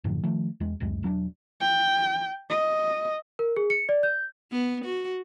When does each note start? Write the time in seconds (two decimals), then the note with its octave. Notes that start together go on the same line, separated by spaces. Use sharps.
0.04 F#2 A2 D3 F3
0.23 D#3 F3 A3
0.60 E2 G#3
0.80 D1 C#2 F#2 G#3
1.03 E1 F#3 C#4 D4
1.61 G5
2.50 D#5
3.39 A#4
3.57 G#4
3.70 C#7
3.89 D5
4.03 G6
4.52 B3
4.85 F#4